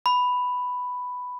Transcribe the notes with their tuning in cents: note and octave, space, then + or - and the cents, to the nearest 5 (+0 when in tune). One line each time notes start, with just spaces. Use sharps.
B5 +5